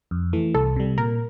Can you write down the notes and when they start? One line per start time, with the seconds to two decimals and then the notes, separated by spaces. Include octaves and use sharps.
0.11 F2
0.33 E3 A3
0.54 C2 A4
0.76 C3 G3
0.97 A#2 A#4